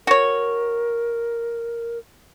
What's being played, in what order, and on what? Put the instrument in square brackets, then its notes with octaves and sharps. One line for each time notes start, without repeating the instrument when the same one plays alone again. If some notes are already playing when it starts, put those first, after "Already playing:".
[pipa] F#4 C#5 [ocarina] A#4